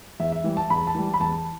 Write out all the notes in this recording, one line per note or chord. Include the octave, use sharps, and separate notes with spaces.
E2 E5
E5
E3 G3
A5
E2 B5
A5
E3 G3
B5
E2 A5